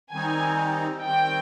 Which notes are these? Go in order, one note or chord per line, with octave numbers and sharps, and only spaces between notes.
D#3 G3 C4 D#4 G#5
D#3 G3 C4 G5